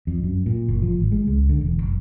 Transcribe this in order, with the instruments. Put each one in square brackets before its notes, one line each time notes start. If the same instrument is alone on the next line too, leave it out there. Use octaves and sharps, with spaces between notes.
[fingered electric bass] F2
F#2
A#2
F#1
F3
G#1
G#3
C#2
D3
E1
F#1